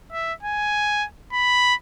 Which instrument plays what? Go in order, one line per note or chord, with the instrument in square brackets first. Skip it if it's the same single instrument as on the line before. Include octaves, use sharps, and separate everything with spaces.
[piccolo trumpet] E5
G#5
B5